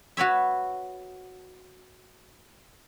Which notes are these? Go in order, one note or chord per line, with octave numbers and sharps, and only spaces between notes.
F#4 B4 C#5 E5